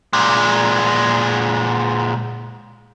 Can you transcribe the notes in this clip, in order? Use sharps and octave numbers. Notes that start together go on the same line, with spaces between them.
A#2 G#3